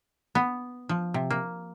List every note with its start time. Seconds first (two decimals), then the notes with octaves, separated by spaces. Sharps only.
0.35 B3
0.89 F3
1.14 C3
1.30 A#3